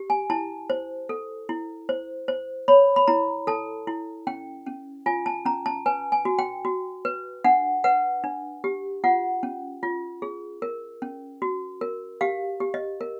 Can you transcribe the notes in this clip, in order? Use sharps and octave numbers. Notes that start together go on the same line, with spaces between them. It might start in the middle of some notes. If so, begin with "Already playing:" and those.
Already playing: G4
G#5
E4 A5
C5
A4
E4
C5
C5
C#5 B5
B5
E4 A#5
A4 A5
E4
C#4 G5
C#4
F4 G#5
A5
C#4 A#5
A5
B4 G#5
G#5
F#4
G5
F#4
B4
D4 F#5
B4 F#5
D4
G4
F4 F#5
C#4
F4
G#4
A#4
C#4
F#4
A#4
G4 F5
G4
D#5
A#4